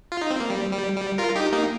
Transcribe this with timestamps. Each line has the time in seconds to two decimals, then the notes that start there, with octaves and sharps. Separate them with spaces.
0.12 F4
0.21 D#4
0.31 C4
0.40 A#3
0.50 G3
0.73 G3
0.96 G3
1.18 F4 A#4
1.35 D#4 G4
1.52 A#3 D#4